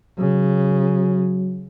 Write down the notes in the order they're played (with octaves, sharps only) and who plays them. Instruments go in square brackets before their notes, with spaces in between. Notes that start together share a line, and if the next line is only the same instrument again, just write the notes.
[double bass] C#3 [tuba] F#3